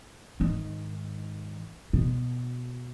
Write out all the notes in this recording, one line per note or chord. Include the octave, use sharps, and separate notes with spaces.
G#2 D#3
B2